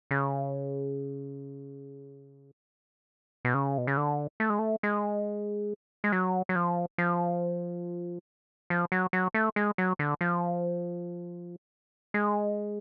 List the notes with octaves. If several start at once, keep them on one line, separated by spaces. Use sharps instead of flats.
C#3
B2
C#3
B2
C#3
D3
A3
G#3
A3
G#3
G#3
F#3
F#3
F3
F3
F3
F#3
F#3
A3
G#3
F#3
D3
F3
G#3